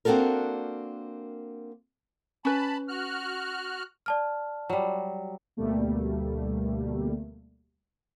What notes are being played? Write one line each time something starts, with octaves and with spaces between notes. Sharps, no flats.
A#3 C4 D4 F#4 A4 A#4
C#4 B4 A5 B5
F#4 F6 F#6
D5 A5 F6
F#3 G3
D2 B2 G3 A3 A#3